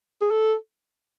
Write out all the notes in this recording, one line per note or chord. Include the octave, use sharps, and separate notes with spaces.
G#4
A4